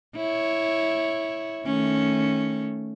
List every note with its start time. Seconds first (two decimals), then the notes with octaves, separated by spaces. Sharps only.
0.16 E4 C#5
1.66 D#3 A3 C#4